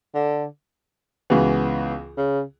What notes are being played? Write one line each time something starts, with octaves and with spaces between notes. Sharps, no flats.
D3
C#2 C#3 E3 B3 F#4
C#3